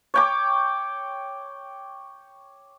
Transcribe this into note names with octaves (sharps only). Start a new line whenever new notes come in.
C#5 G5 D6